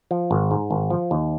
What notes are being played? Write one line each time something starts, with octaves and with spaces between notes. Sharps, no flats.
F3
G#1
G#2
G#1
F3
D#2